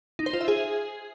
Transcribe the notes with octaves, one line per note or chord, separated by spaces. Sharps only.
D#4
C5
F4
E5
G#4